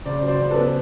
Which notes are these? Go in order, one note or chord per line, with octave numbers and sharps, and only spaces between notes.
C#3 C5 D5
F#3
C5 D5
C#3
A4 B4
B3